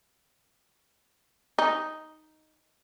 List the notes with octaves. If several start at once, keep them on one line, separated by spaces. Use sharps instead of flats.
D#4